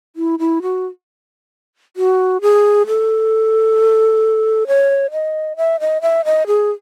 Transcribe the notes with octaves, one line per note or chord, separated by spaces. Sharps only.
E4
E4
F#4
F#4
G#4
A4
C#5
D#5
E5
D#5
E5
D#5
G#4